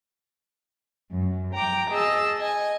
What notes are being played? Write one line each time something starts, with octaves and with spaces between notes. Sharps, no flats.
F#2
G5 A#5 D6
G#4 D#5 A5 E6
D#5 G#5